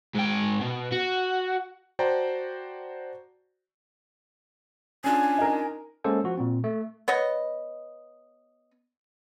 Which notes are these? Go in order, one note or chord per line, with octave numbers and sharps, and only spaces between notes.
G#2 G5
B2
F#4
F#4 C5 D5 G5 A5 A#5
C#4 D4 F4 G#5
D#4 A#4
G#3 A#3 C#4 A4 C5
F3 F#4
A#2 C4
A3
B3 C#5 D#5